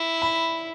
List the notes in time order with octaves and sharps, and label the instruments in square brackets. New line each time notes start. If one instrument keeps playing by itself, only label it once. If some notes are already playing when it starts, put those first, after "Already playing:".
Already playing: [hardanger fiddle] E4
[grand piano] B5